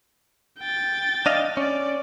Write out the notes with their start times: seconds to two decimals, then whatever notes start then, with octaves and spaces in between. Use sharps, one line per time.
0.60 G5 A6
1.26 D4 D#5 F5
1.57 C#4 D5